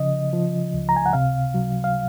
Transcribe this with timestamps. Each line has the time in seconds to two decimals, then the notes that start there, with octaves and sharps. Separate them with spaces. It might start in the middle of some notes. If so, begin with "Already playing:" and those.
Already playing: C#3 F3 D#5
0.33 F3
0.74 C#2
0.89 A#5
0.96 G#5
1.06 F#5
1.13 C3 F5
1.54 F#3
1.84 F5